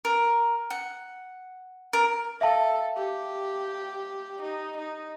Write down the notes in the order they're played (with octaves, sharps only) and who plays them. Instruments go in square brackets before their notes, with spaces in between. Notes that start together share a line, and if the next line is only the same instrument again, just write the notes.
[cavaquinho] A#4
F#5
A#4
[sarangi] A4 [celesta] E5 F5 A5
[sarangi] G4
D#4
D#4